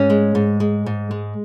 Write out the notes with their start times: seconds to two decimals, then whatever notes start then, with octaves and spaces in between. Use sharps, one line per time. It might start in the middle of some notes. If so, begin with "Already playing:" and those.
Already playing: G#2 C#4
0.10 G#3
0.35 G#2
0.60 G#3
0.86 G#2
1.11 G#3